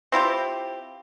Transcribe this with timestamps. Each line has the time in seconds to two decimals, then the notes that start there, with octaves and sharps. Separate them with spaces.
0.12 C4 E4 F4 G4